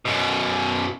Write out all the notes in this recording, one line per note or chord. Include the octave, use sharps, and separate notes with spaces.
F#2 B2